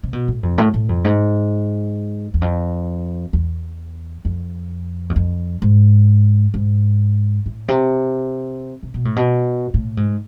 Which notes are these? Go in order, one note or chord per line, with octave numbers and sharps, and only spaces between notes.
C3
B2
A2
F2
A2
A2
F2
G#2
E2
F2
E2
F2
E2
F2
G#2
G#2
A2
C3
C3
B2
A2
B2
A2
G#2